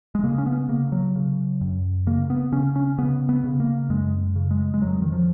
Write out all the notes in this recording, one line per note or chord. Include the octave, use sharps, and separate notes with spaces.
G#3
C#3 A#3
C#4
B3
C#3 A#3
F#3
C#3
F#2
C#3 A#3
B3
C#3 C#4
C#4
C#3 B3
B3
C#3
A#3
F#2 G#3
C#3
G#3
G#3
F2 F#3
D#3
F3